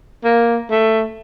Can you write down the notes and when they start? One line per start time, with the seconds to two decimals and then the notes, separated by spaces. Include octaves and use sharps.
0.25 A#3
0.71 A3